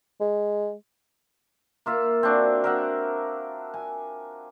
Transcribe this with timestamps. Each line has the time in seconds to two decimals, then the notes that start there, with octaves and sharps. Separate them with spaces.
0.21 G#3
1.86 A#3 F4 E5
2.23 C4 D4 F#4
2.64 A#4 E5 F#5
3.74 G#5